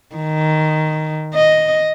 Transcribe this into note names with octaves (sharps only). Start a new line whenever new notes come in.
D#3
D#5